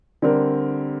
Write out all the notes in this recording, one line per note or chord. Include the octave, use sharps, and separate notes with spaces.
D3 G3 C4 G4 A#4